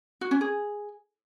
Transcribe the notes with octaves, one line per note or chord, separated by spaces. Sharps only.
F#4
C#4
G#4